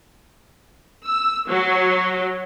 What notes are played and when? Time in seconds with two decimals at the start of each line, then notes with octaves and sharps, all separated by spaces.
1.06 E6
1.48 F#3